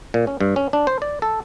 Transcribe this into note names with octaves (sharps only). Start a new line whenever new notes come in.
A#2
C#4
G2
C#4
D4
C5
D5
A4